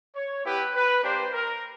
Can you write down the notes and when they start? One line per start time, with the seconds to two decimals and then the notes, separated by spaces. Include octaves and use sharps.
0.16 C#5
0.45 B3 E4 G4 B4
0.75 B4
1.03 A#3 D4 G4 C5
1.33 A#4